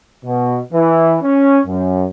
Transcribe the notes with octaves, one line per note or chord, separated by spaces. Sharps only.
B2
E3
C#4
F#2